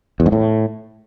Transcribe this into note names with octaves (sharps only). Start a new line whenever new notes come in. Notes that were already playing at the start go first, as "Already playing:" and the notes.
E2
G#2
A2